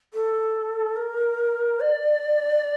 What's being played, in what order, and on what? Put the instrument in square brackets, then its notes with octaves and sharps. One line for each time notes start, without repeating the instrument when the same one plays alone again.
[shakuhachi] A4
A#4
D5